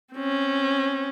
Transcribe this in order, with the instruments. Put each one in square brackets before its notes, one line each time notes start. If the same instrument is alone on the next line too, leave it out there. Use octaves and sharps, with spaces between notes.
[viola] C4 C#4